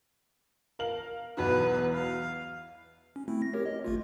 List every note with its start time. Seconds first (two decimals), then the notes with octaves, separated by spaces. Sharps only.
0.79 A#4 F5 F#7
1.37 B1 E2 F#4 B4
1.94 F5
3.16 C#4
3.28 A3 C4 E4
3.42 A#6
3.53 G4 A#4 C#5
3.66 D#5
3.85 G#1 A3 F4